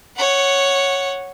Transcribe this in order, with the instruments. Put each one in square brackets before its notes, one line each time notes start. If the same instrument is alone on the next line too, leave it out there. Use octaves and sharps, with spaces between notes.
[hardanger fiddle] C#5 F#5